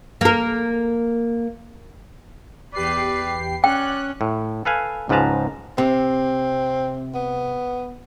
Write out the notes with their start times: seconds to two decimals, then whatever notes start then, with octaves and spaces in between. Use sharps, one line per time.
0.21 A#3 A#4
2.74 E2 G4 B4 D5 C7
3.64 C#4 D5 G5 F#6
4.21 A2
4.65 A4 B4 F5 G#5
5.09 C#2 G#2 F3 B4 A5 A#5
5.78 C3 C4
7.14 B3